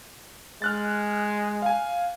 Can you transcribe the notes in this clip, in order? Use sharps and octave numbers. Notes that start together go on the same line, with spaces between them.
G#3 F6 F#6 A6
F5 G#5